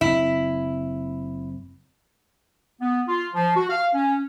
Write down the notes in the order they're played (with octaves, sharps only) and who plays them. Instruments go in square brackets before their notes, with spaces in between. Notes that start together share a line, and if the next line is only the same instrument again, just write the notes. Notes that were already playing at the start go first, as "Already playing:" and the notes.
[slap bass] F#1 C4 [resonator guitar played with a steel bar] E4
[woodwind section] B3
F4
F3
F#4
F5
C#4